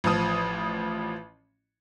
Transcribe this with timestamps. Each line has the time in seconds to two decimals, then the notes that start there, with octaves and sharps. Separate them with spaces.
0.04 A1 F3 D#6